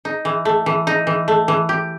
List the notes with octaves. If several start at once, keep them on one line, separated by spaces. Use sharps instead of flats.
D#4
E3
A3
E3
D#4
E3
A3
E3
G4